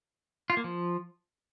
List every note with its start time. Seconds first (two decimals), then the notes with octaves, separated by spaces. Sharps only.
0.50 F4
0.57 A#3
0.64 F3